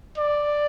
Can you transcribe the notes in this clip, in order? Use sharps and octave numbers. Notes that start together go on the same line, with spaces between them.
D5